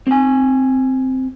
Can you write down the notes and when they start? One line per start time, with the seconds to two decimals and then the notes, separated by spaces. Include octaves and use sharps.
0.07 C4 G#5